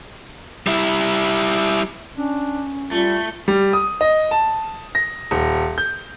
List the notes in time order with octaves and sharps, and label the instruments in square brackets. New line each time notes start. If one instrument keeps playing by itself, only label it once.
[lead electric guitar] G3 E4
[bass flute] C#4 [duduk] D4
[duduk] G3 [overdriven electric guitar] A3 [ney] F4
[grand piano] G3
D#6
D#5
A5
A#6
D#1
G6